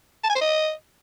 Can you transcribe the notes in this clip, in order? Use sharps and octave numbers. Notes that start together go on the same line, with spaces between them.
A5
G#5
C5
D#5